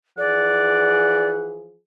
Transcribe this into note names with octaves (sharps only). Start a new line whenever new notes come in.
E3 F3 G#4 D5 F#5